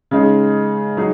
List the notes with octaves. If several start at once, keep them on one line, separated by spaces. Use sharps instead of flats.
C#3 G#3 D#4 G#4
F#3 D#4 G#4